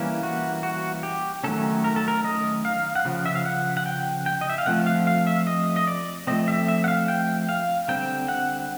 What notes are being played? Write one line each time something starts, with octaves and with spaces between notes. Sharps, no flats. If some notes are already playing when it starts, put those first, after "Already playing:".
Already playing: E3 G3 A#3 C#4
F#4
F#4
G4
D#3 F#3 A3 C#4 A4
A#4
A4
A#4
D#5
F5
F#5
C#3 F3
E5
F5
F#5
F#5
G5
G5
D#5
E5
F5
F3 A3 C4 F#5
F5
F5
E5
D#5
D#5
D5
F3 A3 C4 D#5
E5
E5
F#5
F5
G5
F5
D3 G3 C4 G5
F#5